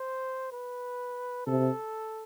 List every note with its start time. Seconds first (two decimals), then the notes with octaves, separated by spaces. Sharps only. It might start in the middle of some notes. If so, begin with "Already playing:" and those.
Already playing: C5
0.52 B4
1.47 C3 A4